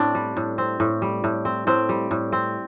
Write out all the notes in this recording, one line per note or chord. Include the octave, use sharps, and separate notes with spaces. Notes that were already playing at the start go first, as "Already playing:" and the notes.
Already playing: A2 C4 D4
G3
A2
C4
A2
G3
A2
C4
A2 C4
G3
A2
C4